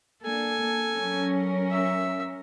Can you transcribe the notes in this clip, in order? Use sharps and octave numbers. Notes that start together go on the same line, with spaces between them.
A#3 D4 A4 G#5
F#3 C#4 A#4
E5